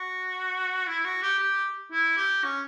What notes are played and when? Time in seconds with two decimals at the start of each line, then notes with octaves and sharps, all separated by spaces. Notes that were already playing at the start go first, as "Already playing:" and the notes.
Already playing: F#4
0.87 E4
1.05 F#4
1.23 G4
1.39 G4
1.92 E4
2.17 G4
2.44 C#4